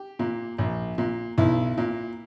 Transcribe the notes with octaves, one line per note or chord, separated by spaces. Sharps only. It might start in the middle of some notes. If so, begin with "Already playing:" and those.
Already playing: G4
A#2
A#1
A#2
B1 E4
A#2